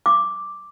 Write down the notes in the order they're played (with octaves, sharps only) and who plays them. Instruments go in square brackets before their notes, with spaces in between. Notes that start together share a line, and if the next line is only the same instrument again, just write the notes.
[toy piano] D6